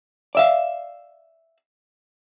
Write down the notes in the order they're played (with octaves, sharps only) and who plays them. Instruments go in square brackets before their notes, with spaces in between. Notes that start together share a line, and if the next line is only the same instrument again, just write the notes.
[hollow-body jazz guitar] D5 E5 F5